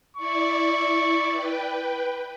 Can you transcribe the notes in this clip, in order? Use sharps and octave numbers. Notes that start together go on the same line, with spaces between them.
E4 D5 C#6
B4 G5